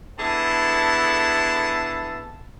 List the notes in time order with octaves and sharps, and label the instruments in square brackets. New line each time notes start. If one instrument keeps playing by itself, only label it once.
[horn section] D3 B3 E4 G#4 A4 A5